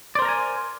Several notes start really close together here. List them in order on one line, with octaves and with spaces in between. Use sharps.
D5 C5 A#4 A#5 G#5